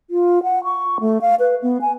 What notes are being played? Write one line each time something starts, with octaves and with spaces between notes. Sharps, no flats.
F4
F#5
C#6
A3
F5
B4
B3
G#5